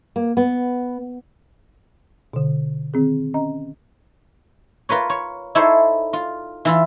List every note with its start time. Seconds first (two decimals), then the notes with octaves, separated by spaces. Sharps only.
0.16 A#3
0.37 B3
2.33 B2 D3
2.94 D#3 C4 G#4
3.34 C#4 D#5 A#5
4.89 F4 A#4 B4 C#5
5.10 C#5
5.55 D#4 E4 G#4 A4 C5 C#5
6.13 F4
6.65 E3 E4 F4